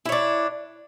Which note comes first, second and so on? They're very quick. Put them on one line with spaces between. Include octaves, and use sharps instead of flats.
E4 C#5 D4